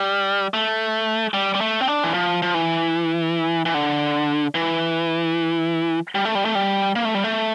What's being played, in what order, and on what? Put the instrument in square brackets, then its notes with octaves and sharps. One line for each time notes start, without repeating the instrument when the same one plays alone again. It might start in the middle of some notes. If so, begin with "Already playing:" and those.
Already playing: [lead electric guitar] G3
A3
G3
G3
A3
C4
D4
E3
F3
F3
E3
E3
D3
E3
G3
A3
G3
A3
G3
A#3
A3
G3
A3